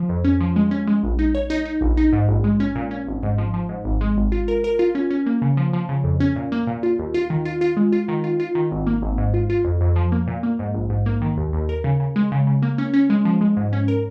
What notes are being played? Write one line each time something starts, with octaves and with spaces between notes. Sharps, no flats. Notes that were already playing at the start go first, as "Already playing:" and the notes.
Already playing: F3
F2
C#4
F3
G#3
C#4
G#3
A#1
D#4
C#5
D#4
D#4
A#1
D#4
G#2
A#1
G#3
C#4
A#2
C#4
G#1
G#2
F3
F3
G#2
G#1
G#3
G#1
F4
A#4
A#4
F4
C#4
C#4
A#3
C#3
F3
F3
C#3
F2
C#4
A#2
A#3
A#2
F4
D#2
F4
D#3
F4
F4
G#3
F4
D#3
F4
F4
D#3
G#1
A#3
G#1
G#2
F4
F4
F2
F2
F3
A#3
A#2
A#3
G#2
A#1
G#2
A#3
D#3
D#2
D#2
A#4
C#3
C#3
G#3
C#3
C#3
A#3
C#4
C#4
G#3
F3
G#3
G#2
C#4
A#4